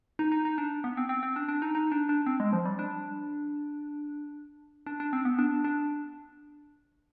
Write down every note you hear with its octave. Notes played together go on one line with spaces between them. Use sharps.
D#4
D#4
D#4
D4
B3
C4
C4
C4
D4
D4
D#4
D#4
D4
D4
C4
G#3
F3
G3
D4
D4
D4
C4
B3
D4
D4